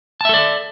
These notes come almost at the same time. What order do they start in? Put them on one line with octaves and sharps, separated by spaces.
A5 E5 A4 D5